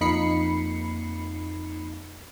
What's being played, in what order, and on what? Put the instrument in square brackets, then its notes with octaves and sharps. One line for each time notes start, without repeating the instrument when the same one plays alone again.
[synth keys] F2 A#3 D#4 B5 C7 C#7